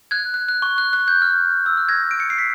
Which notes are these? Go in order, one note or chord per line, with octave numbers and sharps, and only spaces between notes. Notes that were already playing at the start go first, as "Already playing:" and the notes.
F#6 G#6
F#6
F#6
C#6
F#6
F#6
G6
F6
E6
F6
G#6 A#6
D7
C#7
C7
B6 C#7